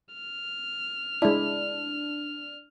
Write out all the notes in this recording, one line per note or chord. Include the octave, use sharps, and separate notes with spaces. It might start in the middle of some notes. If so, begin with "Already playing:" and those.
F6
G#3 D4 E4